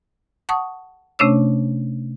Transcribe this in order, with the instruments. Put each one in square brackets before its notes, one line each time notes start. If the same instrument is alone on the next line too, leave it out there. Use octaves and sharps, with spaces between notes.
[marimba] F#5 A5 C#6 D#6
C3 A3 C#4 D4 C#5 E6